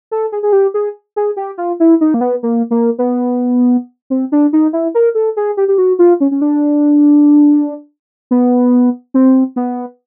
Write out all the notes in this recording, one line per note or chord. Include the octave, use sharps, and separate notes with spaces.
A4
G#4
G#4
G4
G#4
G#4
G4
F4
E4
D#4
A#3
B3
A#3
A#3
B3
C4
D4
D#4
E4
A#4
A4
G#4
G4
G4
F#4
F4
C#4
C#4
D4
B3
C4
B3